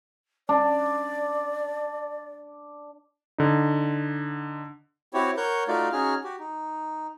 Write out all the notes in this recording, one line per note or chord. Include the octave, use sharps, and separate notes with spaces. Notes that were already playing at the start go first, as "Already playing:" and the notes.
D4 D5
D3 D#4
C4 E4 F#4 G4 C#5
A#4 C#5 F#5 C#6 G6
A3 D#4 F4 F#4 D5 F5
C#4 D#4 F#4 G#4 F6
F#4 G4
D#4